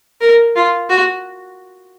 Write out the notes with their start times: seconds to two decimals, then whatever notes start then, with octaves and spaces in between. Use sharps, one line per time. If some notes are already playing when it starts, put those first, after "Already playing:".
0.21 A#4
0.56 F4
0.90 F#4